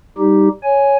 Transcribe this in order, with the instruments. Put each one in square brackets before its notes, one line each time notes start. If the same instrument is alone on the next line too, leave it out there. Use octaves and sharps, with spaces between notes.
[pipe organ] G3 D#4 G4
C#5 G#5